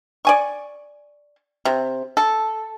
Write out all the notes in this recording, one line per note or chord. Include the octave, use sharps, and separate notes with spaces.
D5 G#5 C#6
C3
A4